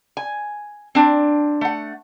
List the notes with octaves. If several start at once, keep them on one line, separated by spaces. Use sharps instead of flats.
G#5
C4 D4
A3 F#5